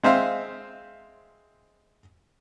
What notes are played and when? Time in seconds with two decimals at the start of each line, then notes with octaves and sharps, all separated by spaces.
0.03 G#3 C4 E5 F5